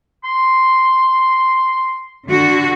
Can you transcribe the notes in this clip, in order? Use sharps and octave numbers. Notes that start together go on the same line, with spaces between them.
C6
D3 F#4